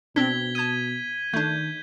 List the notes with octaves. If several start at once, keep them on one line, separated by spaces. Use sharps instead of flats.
B2 C4 D4 G#6 B6 G7
A5 D#6 G#6 D#7
D#3 A3 D4 G6